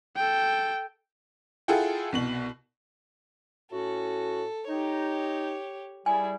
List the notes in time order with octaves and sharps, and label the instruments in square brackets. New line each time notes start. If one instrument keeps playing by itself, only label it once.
[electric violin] A4 G5
[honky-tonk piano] E4 F4 G#4 A4 F#5 G5
C2 B2 F#7
[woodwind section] A2 C#4 F#4 [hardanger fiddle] A4
[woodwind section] D#4 [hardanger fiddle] G4 C#5
[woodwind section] G3 [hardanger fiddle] E4 G#4 [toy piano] G#5